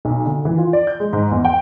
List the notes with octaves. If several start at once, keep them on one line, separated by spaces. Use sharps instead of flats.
B1
D3
E3
F4
D5
G6
G#3
G#2
E2
G5